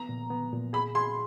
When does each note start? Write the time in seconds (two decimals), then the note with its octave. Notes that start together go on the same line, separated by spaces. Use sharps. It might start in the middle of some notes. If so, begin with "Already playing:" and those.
Already playing: B3 A#5
0.09 A#2
0.30 B3
0.52 A#2
0.73 G#4 B5
0.95 G#4 C6